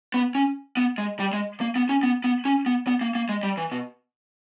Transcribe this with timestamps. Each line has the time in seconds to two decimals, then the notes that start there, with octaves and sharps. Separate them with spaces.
0.14 B3
0.35 C#4
0.77 B3
0.98 G#3
1.19 G3
1.33 G#3
1.61 A#3
1.76 B3
1.89 C#4
2.03 B3
2.24 B3
2.45 C#4
2.66 B3
2.87 B3
3.01 A#3
3.15 A#3
3.29 G#3
3.43 G3
3.57 E3
3.72 B2